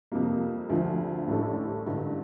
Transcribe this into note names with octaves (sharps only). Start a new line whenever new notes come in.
F2 C3 G3 A#3
D2 D3 F3
A1 A2 G3 D4 A4
A1 G2 D3 G3